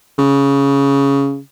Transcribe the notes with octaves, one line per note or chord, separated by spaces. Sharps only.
C#3